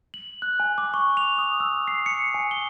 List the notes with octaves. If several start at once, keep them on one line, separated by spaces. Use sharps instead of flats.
F#7
F#6
G#5
D6
C#6
F7
D#6
E6
C7
C#7
G#5
G7